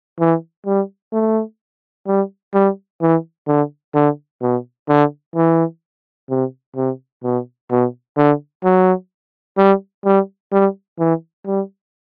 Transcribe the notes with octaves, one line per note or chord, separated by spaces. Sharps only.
E3
G3
A3
G3
G3
E3
D3
D3
B2
D3
E3
C3
C3
B2
B2
D3
F#3
G3
G3
G3
E3
G3